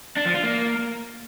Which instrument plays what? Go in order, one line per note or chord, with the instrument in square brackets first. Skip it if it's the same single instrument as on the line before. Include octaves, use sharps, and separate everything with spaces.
[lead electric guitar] D4
F3
F4
A#3